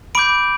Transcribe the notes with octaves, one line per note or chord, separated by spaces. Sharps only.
B5 D6 G6 D7